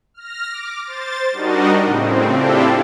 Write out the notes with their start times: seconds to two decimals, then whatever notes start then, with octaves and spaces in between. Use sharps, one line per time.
0.14 F6 A#6
0.51 D6
0.82 C5 A6
1.32 G3 D4 D#4 F#4 A#4 D#5
1.84 A2 C#3 C4
2.28 C4 D4 E4 F4 G4 A4